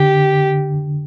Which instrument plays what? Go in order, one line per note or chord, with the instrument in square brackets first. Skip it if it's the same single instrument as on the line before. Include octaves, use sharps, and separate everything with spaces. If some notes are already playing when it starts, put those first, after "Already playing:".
Already playing: [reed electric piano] D3 [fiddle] G4